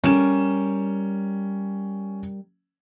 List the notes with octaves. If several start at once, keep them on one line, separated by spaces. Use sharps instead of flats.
G3 C#4 A#4 E7